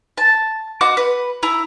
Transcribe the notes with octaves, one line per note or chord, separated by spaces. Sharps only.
A5
F#4 D#5 D6 F#6
B4
E4 A#5